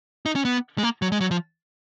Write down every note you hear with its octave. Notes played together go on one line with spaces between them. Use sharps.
D#4
C#4
B3
G#3
A#3
F#3
G#3
F#3
F3